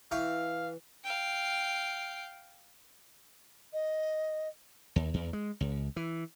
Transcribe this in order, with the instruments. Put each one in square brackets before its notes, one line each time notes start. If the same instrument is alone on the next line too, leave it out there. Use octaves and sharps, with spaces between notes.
[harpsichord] E3 G5 C#6 [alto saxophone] F5
[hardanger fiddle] F5 G5
[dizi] D#5
[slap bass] D#2
E2
G#3
C#2
E3